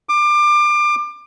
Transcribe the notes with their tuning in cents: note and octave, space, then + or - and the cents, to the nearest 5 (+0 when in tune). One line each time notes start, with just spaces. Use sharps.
D6 +25